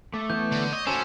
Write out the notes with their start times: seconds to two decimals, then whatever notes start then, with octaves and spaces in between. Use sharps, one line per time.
0.14 A3 D6
0.30 E3 B3 C#5 G6
0.52 D3
0.73 C#5 D#5
0.87 C#4 F#4 A4 C5 G#5 E6 E7